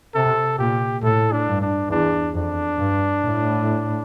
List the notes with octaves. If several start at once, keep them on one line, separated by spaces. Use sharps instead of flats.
C3 A4
A#2 G4
A2 A4
D4
G2
D4
E2 D4
F2 D4
G2
A2